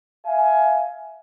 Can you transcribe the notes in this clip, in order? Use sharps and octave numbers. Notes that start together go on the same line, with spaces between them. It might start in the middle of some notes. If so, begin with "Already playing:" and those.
E5 F5 G#5